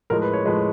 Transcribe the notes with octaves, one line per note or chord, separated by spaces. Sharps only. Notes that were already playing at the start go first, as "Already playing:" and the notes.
A2 F3 G#3 A#4
B4
C#5
A2 F3 G#3 B4